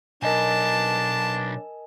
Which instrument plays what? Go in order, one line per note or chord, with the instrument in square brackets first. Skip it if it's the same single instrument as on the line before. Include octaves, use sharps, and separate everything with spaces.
[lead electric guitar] B1 [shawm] D4 [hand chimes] A#4 D#5 G#5 [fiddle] A5